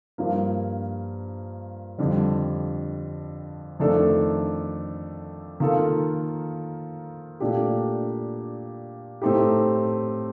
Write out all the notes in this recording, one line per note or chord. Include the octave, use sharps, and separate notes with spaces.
G2 F3 A#3
F2 D3 G3
F2 D#3 A3 D4 A4
D#3 A#3 F4 A4
A#2 A3 D4 G4
A2 A3 C4 D#4 G4